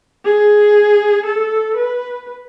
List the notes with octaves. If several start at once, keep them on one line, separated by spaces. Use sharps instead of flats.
G#4
A4
B4